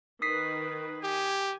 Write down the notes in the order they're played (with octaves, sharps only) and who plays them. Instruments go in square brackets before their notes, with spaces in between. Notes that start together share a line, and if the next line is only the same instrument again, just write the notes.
[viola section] D#3 B4 [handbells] D#6 B6 C7
[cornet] G4 [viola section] G#5